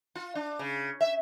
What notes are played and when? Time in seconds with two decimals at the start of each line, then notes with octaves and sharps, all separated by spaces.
0.15 F4
0.35 D4
0.59 C#3
1.01 E5